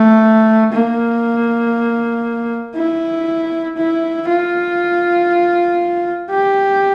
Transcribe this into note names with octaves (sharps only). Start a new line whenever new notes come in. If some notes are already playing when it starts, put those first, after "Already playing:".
Already playing: A3
A#3
E4
E4
F4
G4